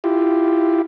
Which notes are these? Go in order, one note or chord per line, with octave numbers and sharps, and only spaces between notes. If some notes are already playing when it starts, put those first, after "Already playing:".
E4 F4 G4